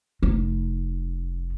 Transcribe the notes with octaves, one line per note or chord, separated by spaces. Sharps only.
F1 D#4